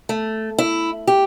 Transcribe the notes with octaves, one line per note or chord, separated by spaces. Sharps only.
A3
E4
G4